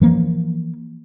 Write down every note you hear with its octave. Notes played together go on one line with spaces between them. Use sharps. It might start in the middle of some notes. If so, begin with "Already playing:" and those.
E3 F3 A#3